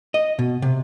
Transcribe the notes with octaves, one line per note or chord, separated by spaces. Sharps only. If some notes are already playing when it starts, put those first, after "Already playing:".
D#5
B2
C3